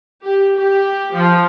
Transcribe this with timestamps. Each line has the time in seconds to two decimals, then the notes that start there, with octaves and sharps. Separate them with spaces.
0.25 G4
0.57 G4
1.14 F3